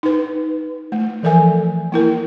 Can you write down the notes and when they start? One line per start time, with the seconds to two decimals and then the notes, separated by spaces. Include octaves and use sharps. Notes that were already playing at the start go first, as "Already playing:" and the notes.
0.03 D#4 B4
0.92 A3
1.23 E3 F3 A4 A#4 E5 G#5
1.92 A#3 E4 A#4